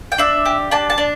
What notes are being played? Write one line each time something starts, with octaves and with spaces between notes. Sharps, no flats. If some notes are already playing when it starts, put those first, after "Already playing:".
G5
D4 E5
G4
D4 A5
A5
D4